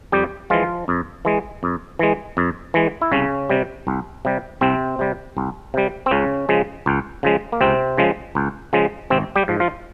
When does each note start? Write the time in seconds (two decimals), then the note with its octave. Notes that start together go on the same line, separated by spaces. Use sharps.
0.12 F2 G3 G4
0.50 E3 F3 G#3 F4
0.88 F2
1.25 E3 G#3
1.63 F2
1.99 E3 G#3
2.37 F2
2.74 E3 G#3
3.02 E4
3.12 C2 C#3 C#4
3.49 C3 G3
3.87 C2
4.25 C3 G3
4.61 C2 C3 C4
4.99 C3 G3
5.37 C2
5.74 C3 G3
6.06 C4
6.11 C#2 C#3 C#4
6.49 C#3 F3 G#3
6.86 C#2
7.23 C#3 F3 G#3
7.52 A#3
7.61 C#2 C3 C4
7.98 C#3 F3 G#3
8.35 C#2
8.73 C#3 F3 G#3
9.10 G#1 C3 C4
9.36 G3 G4
9.48 G#2 F3
9.60 F3 F4